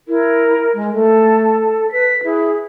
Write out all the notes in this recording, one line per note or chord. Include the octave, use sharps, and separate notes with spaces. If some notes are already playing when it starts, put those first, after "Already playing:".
E4 A#4
G#3
A3 A4
B4 B6
E4 G#4